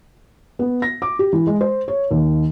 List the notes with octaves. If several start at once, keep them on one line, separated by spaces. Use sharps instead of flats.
B3
A#6
D6
G4
E3
G#3
C5
C#5
D#2